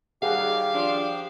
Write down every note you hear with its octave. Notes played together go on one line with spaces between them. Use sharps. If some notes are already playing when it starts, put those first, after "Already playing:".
D#3 F#3 G3 G4 G#4 F5 F#5
F3 D4